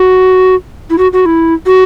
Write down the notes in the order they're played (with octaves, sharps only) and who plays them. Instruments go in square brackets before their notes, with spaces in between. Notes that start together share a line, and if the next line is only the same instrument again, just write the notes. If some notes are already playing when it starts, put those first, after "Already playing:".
Already playing: [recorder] F#4
E4
F#4
F#4
E4
F#4